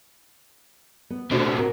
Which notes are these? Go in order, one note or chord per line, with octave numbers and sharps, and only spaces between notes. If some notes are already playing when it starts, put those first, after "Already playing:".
B3
B2 A3 C4 D4 F#4
F#4 A#4